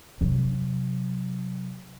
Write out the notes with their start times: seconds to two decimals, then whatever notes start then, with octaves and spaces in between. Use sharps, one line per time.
0.21 C3 F#3